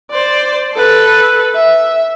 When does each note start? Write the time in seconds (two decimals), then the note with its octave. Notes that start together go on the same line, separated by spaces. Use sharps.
0.11 C5 D5
0.74 A4 B4
1.55 E5